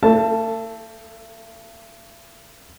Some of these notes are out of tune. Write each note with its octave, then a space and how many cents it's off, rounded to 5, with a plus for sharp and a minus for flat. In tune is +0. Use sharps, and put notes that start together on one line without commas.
A3 +45 A4 +0 A5 +0